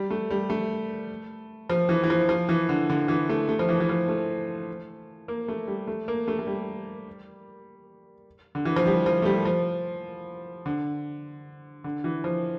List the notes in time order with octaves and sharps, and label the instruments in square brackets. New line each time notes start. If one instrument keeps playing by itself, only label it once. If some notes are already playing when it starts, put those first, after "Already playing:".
Already playing: [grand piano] G3
A3
G3
A3
F3
E3
E3
F3
F3
E3
D3
D3
E3
A3
A3
F3
E3
E3
F3
A3
A#3
A3
G3
A3
A#3
A3
A3
G3
D3
E3
F3
G3
F3
A3
G3
F3
D3
D3
E3
F3